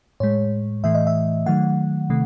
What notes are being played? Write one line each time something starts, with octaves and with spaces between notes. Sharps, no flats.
A2 G#3 C#5
A2 E3 A3 E5
D#5
E5
D#3 F#3 A3 F#5
C3 D#3 A3